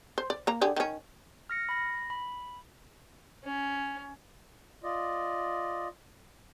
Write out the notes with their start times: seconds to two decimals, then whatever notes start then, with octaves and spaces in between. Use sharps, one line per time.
0.18 C5
0.30 D5
0.47 A#3 A#5
0.61 D3 G4 G#4
0.76 D#3 C#4
1.50 F6 A#6 C#7
1.69 B5 A#6
2.10 B5
3.44 C#4
4.84 F4 D5 D#5